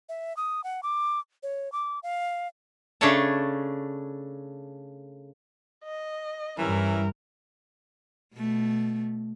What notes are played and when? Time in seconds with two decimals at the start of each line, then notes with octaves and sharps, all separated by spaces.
0.09 E5
0.37 D#6
0.64 F#5
0.83 D6
1.43 C#5
1.72 D6
2.03 F5
3.01 C#3 A3 D4 A4 C#5 A5
5.84 D#5
6.59 G2 E3 G3 C#4 E4 A#4
8.34 B2 A3